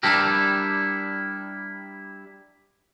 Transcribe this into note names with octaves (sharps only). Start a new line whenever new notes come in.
G3 D4 E4 G4 A#4